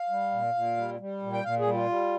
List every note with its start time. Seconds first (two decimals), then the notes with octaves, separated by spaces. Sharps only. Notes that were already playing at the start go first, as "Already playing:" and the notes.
Already playing: F5
0.10 G3
0.31 A#2
0.54 A#2
0.77 G3
1.00 G3
1.22 A#2
1.33 G5
1.44 A#2 F5
1.59 G#4
1.66 G3
1.74 F4
1.89 G3